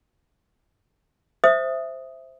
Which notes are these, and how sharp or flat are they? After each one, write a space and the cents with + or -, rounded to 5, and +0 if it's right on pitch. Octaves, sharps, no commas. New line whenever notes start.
C5 +0 E5 +0 D#6 +0